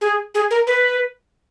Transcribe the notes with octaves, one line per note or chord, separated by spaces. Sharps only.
G#4
G#4
A#4
B4